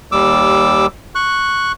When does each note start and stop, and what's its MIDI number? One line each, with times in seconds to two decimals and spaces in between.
0.12 0.86 39
0.12 0.86 55
0.12 0.86 86
0.12 0.86 88
1.15 1.72 85
1.15 1.72 90